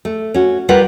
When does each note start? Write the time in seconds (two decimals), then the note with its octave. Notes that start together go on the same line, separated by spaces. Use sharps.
0.05 A3
0.34 C#4 F#4
0.69 G3 F4 A#4 B4 F#5